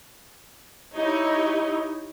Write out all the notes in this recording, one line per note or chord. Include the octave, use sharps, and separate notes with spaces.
D#4 E4 G4 C#5 D#5